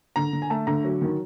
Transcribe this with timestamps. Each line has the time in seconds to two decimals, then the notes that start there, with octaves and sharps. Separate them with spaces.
0.16 D3 A#5
0.33 D3
0.42 G#5
0.50 A3 A5
0.67 D3 A#5
0.85 F#3
1.02 D#3